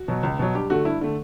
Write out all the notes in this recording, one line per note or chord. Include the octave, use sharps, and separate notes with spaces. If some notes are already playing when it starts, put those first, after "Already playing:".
Already playing: F#4
B2 F#3
C#2
B2 F#3
G2 G4
D3 A3 F#4
G2 E4
D3 A3